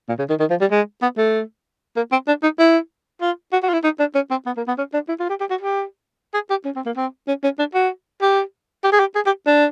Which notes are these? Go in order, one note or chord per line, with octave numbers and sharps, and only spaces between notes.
A#2
C#3
D#3
D#3
F3
G3
G#3
B3
A3
A#3
C4
D4
D#4
E4
F4
F#4
F#4
F4
E4
D#4
D4
C#4
C4
B3
A#3
B3
C#4
D4
E4
F4
G4
G4
F#4
G4
G#4
G4
C#4
C4
A#3
C4
C#4
C#4
D4
F#4
G4
G4
G#4
G4
G#4
G4
D4